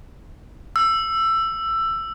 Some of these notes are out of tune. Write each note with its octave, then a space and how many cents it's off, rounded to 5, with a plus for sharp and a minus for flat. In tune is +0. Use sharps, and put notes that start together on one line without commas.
E6 +15